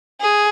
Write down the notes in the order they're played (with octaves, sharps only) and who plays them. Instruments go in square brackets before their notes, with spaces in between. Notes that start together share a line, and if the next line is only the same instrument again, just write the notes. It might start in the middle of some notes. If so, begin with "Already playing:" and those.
[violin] G#4